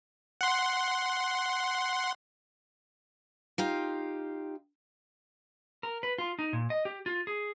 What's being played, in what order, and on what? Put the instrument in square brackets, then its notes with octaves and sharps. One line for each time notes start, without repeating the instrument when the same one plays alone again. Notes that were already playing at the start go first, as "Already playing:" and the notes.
[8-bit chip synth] F#5 C6
[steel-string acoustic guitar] D#4 F4 G4
[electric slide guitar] A#4
B4
F4
D#4
A#2
D#5
G4
F4
G#4